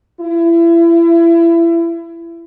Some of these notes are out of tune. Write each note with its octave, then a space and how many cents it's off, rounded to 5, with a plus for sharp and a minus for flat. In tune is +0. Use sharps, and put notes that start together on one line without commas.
E4 +30